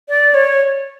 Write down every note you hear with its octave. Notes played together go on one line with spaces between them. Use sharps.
D5
C#5